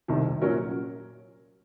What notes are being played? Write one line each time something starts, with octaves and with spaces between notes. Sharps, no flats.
C2 C3 D#3
A#2 F#3 C#4 F#4 A#4